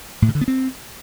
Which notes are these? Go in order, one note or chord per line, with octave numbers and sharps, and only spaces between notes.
A2
C#3
D3
B3
C4